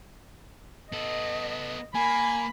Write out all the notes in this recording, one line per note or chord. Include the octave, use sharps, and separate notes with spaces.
B3 A4 D#5
A#3 G#5 B5